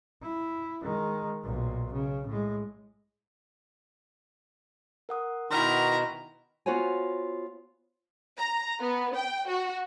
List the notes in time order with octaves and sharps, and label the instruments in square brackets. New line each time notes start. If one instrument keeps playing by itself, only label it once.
[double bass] E4
D#3 G#3
B1 A#2
C#3
A2 G#3
[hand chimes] A#4 F#5 D#6
[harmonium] B2 F#4 [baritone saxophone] D#3 [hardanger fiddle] E4 A#5 [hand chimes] C6 F6
[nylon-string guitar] B3 F4 F#4 C5 C#5 G#5
[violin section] A#5
B3
G5
F#4